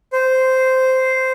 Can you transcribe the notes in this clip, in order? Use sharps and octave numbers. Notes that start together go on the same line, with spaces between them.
C5